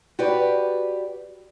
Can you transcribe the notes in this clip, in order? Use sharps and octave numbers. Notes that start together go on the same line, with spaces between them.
F#4 G4 B4 D5